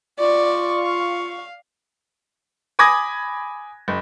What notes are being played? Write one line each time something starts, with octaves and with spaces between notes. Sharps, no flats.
F4 D5 C#6
F5
G#5 B5 D6 D#6 G#6 A#6
F#1